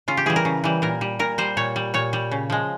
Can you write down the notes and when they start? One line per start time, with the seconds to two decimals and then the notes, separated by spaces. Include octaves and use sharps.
0.08 C#3 F4
0.17 G4
0.26 E3 G3 G#4
0.36 A#4
0.45 C#3
0.64 E3 G3
0.82 A#2 A#4
1.01 G3
1.19 A#2 A#4
1.38 G3 C5
1.57 A#2 C#5
1.76 G3
1.94 A#2 C#5
2.13 G3
2.31 C#3
2.50 F3 G#3